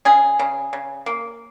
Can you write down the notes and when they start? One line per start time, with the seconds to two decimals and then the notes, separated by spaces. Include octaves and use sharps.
0.05 C#3 G#4
0.39 C#3
0.73 C#3
1.06 A#3